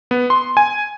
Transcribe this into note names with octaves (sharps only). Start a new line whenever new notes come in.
B3
C6
G#5